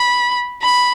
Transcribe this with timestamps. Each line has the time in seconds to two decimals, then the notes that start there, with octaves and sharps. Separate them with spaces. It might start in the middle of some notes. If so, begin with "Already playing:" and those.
Already playing: B5
0.62 B5